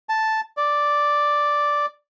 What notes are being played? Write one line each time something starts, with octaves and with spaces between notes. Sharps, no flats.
A5
D5